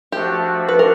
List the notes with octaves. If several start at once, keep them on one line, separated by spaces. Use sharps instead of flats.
F3 A3 D4 F#4 G4
B4
A#4